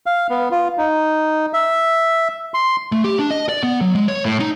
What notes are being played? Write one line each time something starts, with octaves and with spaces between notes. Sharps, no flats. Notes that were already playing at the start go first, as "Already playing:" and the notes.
F5
B3
F4
D#4
E5
C6
A3
G4
D4
D#5
D5
B3
F#3
G#3
C#5
A2
D#4